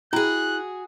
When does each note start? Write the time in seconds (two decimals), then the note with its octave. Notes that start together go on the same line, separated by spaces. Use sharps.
0.13 E4 F#4 G#4 G5 A#5 F#6